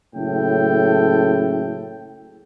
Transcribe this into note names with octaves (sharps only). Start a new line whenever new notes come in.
F#1 A2 C#3 A4 G5